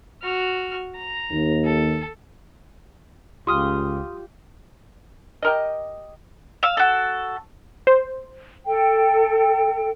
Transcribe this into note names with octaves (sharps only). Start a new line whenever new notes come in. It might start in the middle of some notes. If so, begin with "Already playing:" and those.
F#4 F6
A#5
D#2
A4
C#2 F4 G4 C6 D#6 F6
G4 A#4 D#5
F5 E6
F#4 A4
C5
A4 G5